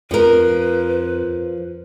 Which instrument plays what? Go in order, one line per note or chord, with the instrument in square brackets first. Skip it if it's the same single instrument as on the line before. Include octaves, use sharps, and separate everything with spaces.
[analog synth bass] F2 [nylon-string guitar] F3 A#4 [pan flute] B4